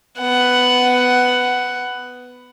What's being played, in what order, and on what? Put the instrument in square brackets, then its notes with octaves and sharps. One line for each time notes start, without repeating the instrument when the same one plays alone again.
[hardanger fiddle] B3 F#5